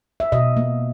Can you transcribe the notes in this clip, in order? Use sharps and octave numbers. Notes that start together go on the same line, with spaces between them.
E5
B2 D#5
A#3